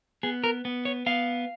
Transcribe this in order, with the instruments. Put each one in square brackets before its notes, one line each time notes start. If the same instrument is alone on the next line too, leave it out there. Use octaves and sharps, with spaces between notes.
[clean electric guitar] B3 G#4
A#4
B3
C#5
B3 F5